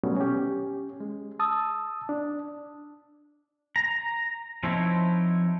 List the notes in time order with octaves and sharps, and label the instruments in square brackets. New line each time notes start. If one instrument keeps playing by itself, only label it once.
[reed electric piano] B2 F#3 G3 A3 B3 C#4
C#4 G4
G#3
A5 D#6 E6
D4
[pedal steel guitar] A#5
F3 C4 D#4 E4 C#5